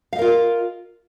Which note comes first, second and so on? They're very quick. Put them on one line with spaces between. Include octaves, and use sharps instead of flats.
F5 D#5 A#4 F4